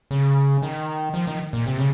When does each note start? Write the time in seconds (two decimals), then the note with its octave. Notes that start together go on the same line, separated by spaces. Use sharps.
0.11 C#3
0.62 D#3
1.14 F3
1.27 D#3
1.53 A#2
1.66 C3
1.79 C#3